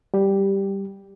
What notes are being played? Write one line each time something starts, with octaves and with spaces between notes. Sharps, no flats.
G3 G4